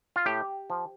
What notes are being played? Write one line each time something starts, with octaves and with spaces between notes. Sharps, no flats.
F4
A2 G4
F3